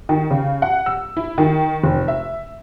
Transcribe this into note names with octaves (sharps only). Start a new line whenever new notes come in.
D#3
C#3
F#5
E6
E4
D#3
F1
E5